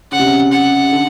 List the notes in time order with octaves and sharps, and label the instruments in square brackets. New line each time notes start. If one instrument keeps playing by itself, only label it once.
[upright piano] C#3 [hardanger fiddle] F#5
[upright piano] C3
C#3
[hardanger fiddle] F#5
[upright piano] D3